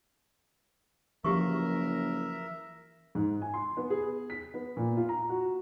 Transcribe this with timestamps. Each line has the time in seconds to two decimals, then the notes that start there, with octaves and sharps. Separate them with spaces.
1.24 F#1 E3 F3 G4 A#4 E5 C#6
3.15 G#2
3.42 G#5
3.54 C6
3.77 B3
3.90 G#4
4.30 B6
4.54 B3
4.77 A#2
4.97 F4
5.09 A#5
5.29 F#4